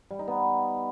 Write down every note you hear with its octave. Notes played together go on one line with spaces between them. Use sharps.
G3
D#4
B3